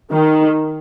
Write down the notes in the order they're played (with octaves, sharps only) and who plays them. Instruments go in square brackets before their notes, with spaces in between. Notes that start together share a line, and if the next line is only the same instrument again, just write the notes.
[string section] D#3